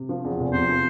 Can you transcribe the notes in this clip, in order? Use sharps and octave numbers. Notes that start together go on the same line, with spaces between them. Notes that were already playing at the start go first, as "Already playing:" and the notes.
Already playing: C3
F3
E2
F1
C3 C5
F3